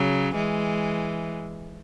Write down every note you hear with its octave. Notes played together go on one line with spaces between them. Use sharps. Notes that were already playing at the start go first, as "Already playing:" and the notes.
Already playing: C#3 F#3
E3 G#3